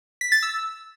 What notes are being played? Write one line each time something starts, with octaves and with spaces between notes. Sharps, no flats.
B6
A6
E6